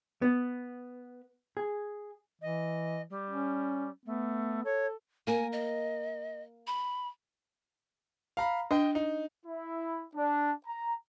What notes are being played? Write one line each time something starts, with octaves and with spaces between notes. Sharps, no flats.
B3
G#4
E3 D#5
G3
C#4
A3 B3
A4 C#5
A#3 A#4 G#5
D#5
B5
F5 A#5 B5
D4 D#5 G5
D#4
E4
D4
A#5